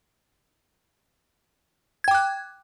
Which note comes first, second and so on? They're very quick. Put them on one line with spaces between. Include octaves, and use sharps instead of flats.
G#6 G5 D6 F#6